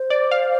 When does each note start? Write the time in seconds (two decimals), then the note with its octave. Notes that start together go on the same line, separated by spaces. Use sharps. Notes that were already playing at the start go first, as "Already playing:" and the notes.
Already playing: C5
0.10 D5
0.31 F5